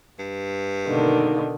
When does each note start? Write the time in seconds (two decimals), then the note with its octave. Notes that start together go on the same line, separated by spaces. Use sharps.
0.19 G2
0.87 F#1 B2 D3 D#3 A#3 D#4